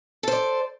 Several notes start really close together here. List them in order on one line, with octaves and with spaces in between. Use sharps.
A4 C5 D5